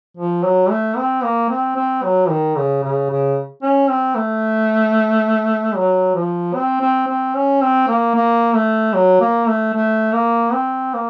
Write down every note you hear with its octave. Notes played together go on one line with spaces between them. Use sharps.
F3
F#3
A3
C4
A#3
C4
C4
F#3
D#3
C#3
C#3
C#3
C#4
C4
A3
F#3
F3
C4
C4
C4
C#4
C4
A#3
A#3
A3
F#3
A#3
A3
A3
A#3
C4
A#3